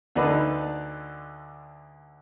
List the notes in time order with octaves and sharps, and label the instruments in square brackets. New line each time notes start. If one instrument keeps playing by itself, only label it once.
[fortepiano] D2 D3 D4 D#4 B4